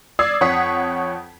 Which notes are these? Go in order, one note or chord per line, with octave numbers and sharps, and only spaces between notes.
D5 D#6 E6 G#6 C7
F2 C#5 F#5 D#6 B6